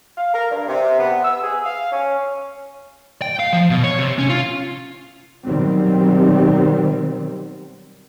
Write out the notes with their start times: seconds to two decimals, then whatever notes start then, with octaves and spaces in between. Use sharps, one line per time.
0.18 F5
0.34 A#4
0.51 G2
0.68 C3
1.00 B3
1.24 E6
1.43 G#4
1.65 F5
1.92 C#4
3.22 G5
3.39 F5
3.53 F3
3.70 B2
3.84 C#5
3.99 C3
4.18 C#4
4.30 F4
5.45 B2 D#3 F#3 G3 C4